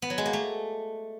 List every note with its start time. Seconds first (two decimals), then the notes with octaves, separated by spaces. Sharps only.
0.02 B3
0.10 F#3
0.18 G#3
0.26 A#3
0.33 A3